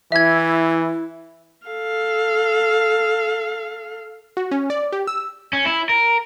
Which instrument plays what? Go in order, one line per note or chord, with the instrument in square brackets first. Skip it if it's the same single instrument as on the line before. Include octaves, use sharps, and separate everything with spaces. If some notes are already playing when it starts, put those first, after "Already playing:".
[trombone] E3 [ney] E4 [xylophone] E5 G#6
[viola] A4 F5
[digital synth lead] F#4
C#4
D5
G4
E6
[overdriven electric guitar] C#4
E4
A#4